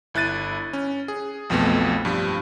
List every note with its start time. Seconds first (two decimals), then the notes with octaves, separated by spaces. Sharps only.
0.14 G1 E4 F#6 A6 D#7
0.73 C#4
1.08 G#4
1.50 B1 F2 B2 F3 A3 B3
2.05 G2 F3 G3